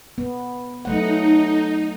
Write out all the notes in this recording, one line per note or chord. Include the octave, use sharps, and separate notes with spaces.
B3
F#3 A3 D#4 F#5